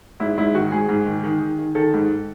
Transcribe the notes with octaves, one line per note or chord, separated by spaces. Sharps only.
G#2 E4
G#2 E4
D#3 F#4
G#2 G#4
G#2
D#3
D#3
D#3
D#3
D#3 A4
G#2